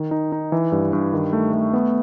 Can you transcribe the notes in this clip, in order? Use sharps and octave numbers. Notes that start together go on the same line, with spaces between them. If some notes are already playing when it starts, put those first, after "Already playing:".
Already playing: D#3
D#4
D#4
E3
G2
G2
D#3
A3
A3
B3